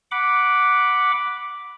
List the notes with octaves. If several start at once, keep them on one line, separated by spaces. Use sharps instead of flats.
F#5 B5 D6